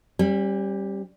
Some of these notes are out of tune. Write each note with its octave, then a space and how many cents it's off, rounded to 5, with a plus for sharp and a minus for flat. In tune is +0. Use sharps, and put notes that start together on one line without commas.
G3 +0 C#4 -45